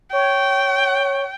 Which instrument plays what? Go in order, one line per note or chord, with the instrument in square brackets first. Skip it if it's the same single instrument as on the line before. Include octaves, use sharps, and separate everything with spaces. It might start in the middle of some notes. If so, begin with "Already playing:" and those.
[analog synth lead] C#5 [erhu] G5